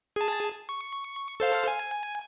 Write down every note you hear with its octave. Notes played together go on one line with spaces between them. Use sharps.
G#4 A5
C#6
A4 C5 F5
G#5